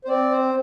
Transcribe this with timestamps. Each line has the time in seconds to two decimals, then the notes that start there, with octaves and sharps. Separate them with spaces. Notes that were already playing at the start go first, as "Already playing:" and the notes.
0.04 C5
0.08 C4 D5
0.32 C5